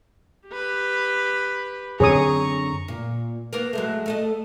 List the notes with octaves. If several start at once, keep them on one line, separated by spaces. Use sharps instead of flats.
G4 B4
F#2 D3 C4 G#4 C#5 A#5 C#6 D#6
A#2
A#3 B3 A#4
F#3 G#3 A3
A3 A4 D#5